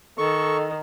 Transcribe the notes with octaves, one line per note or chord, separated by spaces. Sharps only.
D#3 A4 C#6